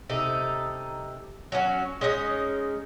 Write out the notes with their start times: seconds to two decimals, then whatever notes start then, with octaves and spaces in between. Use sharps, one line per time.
0.10 C3 D#4 A4
1.52 F#3 A3 C#4 F#4
2.01 G#3 C#4 D#4 D#5